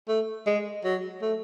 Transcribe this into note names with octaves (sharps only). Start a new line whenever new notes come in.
A3
G#3
F#3
A3